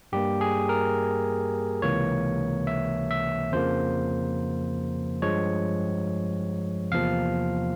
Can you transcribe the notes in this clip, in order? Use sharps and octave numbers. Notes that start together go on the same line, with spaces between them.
G2 G3 A#3 G4
G#4
A#4
C#2 C3 E3 A#3 C#5
E5
E5
F2 C#3 F3 A#3 C5
G2 F3 G#3 C#5
E2 C3 F3 A#3 F5